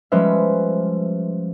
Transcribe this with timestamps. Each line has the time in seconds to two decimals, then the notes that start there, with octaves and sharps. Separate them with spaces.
0.12 F3 G3 G#3 C#4 B4 E5